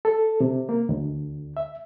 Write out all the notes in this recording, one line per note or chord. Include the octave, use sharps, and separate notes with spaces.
A4
C3
A#3
D2
E5